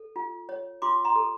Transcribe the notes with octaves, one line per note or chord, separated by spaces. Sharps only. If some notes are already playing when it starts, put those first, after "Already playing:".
Already playing: A4
F4
C#5
F4 C6 D6
A#5 C6
A4